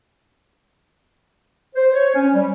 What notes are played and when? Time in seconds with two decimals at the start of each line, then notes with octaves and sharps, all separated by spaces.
1.75 C5
1.93 C#5
2.15 C#4
2.34 G3